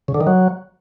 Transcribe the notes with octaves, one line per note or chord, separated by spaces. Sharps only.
C#3
D3
D#3
F#3